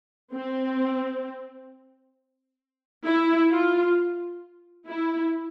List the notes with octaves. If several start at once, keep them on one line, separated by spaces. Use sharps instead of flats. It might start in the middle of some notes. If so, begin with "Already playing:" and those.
C4
E4
F4
E4